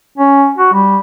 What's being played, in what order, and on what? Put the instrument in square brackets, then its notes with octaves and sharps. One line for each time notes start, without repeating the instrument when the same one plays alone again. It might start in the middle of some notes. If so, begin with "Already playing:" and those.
[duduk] C#4
F#4
G3